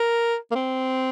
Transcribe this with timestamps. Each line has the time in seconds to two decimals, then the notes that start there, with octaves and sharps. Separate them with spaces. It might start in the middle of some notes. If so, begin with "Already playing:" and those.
Already playing: A#4
0.51 A#3
0.55 C4